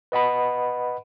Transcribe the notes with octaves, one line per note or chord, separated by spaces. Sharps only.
B4 D#5 F#5 B5